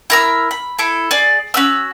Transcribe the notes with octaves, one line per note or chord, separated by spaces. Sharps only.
E4 A#4 E6
B5
E4 A4
G#4 D5
C#4 F#4 E6